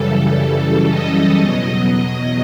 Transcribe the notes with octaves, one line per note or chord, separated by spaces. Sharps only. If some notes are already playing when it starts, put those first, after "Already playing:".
Already playing: F#2 C#3 E3 G3 A4
D#5
E2 B2 F#3 D#5
D#5